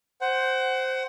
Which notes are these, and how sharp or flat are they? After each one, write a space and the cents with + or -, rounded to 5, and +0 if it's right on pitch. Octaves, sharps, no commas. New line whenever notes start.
C5 +0 F#5 +25